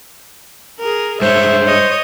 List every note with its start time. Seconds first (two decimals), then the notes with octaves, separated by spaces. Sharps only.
0.80 G#4 A#4
1.22 G2 G#3 C5 C#5 E5
1.65 C#5 D#5